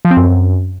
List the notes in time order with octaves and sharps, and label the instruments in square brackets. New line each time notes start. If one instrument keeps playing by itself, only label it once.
[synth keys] F3
C4
F#2